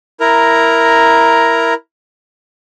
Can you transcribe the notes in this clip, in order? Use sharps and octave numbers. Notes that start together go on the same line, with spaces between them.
E4 A#4 A#5